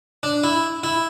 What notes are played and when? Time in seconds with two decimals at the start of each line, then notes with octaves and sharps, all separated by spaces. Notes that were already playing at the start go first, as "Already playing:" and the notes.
0.23 D4
0.44 E4
0.83 E4